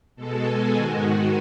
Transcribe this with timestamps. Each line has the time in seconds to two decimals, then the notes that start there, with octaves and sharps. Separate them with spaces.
0.16 B2 G#3 A4
0.45 G#4
0.74 G#2 D#3 G#3 F#4